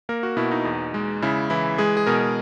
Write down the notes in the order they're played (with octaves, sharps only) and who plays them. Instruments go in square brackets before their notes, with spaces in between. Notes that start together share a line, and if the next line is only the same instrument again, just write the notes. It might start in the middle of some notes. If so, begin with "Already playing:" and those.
[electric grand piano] A#3 A#4
F#4
B2 E4
D#4
E2
G#3
C#3 E4
E3 E4
G#3 G#4
G#4
B2 A#4